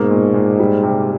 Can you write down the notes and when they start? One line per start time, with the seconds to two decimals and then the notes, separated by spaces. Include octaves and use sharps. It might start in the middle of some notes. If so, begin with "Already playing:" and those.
Already playing: G#2 B2 A#3
0.10 A#2
0.34 A#2
0.59 G3
0.83 C3